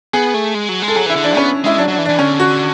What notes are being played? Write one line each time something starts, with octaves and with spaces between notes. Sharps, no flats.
B3 G#4
A3
G#3
F#3
G#3
A4
F#3 G#4
E3 E4
D3
E3 D4
B3 C#4
G#3 E4
F#3 D4
F#3 D4
E3
D4
E3
D3 C#4
F#4